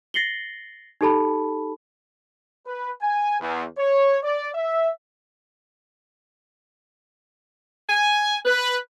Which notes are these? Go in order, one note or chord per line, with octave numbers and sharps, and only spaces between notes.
A6 A#6 C7 C#7 F#7 G7
D#4 G4 A4 A5 B5
B4
G#5
E2
C#5
D5
E5
G#5
B4